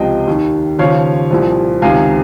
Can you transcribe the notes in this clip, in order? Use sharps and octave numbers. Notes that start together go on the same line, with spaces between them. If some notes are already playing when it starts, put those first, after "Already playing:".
Already playing: C#2 C3 F3 D#5 G5
D#2 D#3
D#2 C#3 F3 C#5 F5
C2 A#2 F3
C#2 C3 D#3 F5 G#5